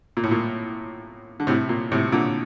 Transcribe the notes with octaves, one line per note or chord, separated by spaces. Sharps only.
A#2
A2
A#2
D3
A2 C3
A#2
A2 C3
A#2 D3